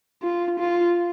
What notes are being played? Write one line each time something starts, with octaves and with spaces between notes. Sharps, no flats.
F4
F4